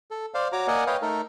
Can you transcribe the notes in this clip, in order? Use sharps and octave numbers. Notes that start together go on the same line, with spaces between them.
A4
C5 D5 F5
F#4 C#5 A#5 D6
A#3 A#4 D5 D#5 F#5 G#5
B4 C#5 D#5 F5 G5
A3 D#4 A4 A#4